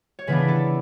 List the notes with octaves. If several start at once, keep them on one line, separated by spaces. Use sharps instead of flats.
C#5
C#3 E3 B3 D4 B4
A4